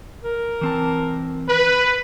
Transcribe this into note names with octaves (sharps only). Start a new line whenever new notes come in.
A#4
E3 C4 A5
B4